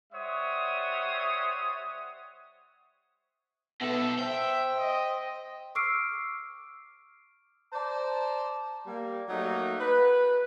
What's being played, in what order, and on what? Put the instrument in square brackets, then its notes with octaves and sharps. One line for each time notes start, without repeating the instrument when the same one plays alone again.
[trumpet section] G3 C5 C#5 E5 F#5 D#6
[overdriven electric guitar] B2 A4 [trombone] B3 [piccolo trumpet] E5
[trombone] C5 [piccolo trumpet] E5 [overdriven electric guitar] G5
[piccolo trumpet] D#5
[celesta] C#6 D6 E6 F6 C7 D7
[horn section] C5 D5 A5 A#5
G3 A#3
F#3 A3 A#3 D#4
B4